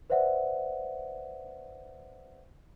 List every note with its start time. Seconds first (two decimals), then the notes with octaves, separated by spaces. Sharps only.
0.10 B4 C5 D5 E5 F#5